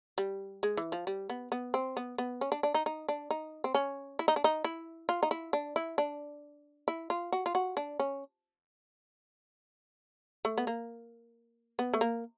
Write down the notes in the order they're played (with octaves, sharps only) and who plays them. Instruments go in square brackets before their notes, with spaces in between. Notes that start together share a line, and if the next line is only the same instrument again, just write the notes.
[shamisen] G3
G#3
E3
F3
G3
B3
B3
C4
B3
B3
C#4
D4
D4
D#4
D#4
D4
D#4
C4
C#4
E4
D#4
D4
D#4
E4
F4
D#4
E4
D4
E4
D4
E4
F4
F#4
F4
F#4
D4
C#4
A3
B3
A#3
B3
A3
A#3